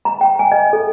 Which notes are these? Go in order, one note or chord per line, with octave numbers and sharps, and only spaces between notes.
A#5
G5
G#5
D#5
A4